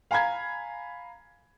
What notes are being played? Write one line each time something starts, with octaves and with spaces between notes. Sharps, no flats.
F5 G#5 A#5 B5 G#6